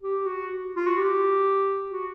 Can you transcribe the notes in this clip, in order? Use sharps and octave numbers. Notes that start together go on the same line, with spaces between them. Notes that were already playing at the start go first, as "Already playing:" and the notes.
G4
F#4
F4
F#4
G4
F#4